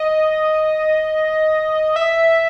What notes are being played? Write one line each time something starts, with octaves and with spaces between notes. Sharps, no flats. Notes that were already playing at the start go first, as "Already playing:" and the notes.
Already playing: D#5
E5